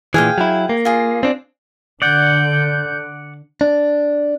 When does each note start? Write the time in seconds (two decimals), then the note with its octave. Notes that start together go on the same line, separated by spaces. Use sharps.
0.14 A#2 E3 G#4 F5 G5
0.38 F#3 E4
0.69 A#3
0.85 F4 G#4
1.23 C4 D4
2.02 D3 D5 F#5 G6
3.61 D4